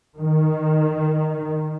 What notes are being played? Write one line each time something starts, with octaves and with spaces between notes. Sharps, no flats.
D#3